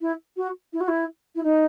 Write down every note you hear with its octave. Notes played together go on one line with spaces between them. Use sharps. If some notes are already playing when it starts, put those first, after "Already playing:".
E4
F#4
E4
F#4
E4
E4
D#4